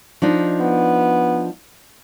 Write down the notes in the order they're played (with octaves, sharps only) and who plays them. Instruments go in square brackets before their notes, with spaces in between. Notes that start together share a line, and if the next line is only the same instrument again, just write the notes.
[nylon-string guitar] F3 D4 D#4
[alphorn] B3